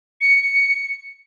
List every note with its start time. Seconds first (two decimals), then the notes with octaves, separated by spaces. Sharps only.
0.20 C#7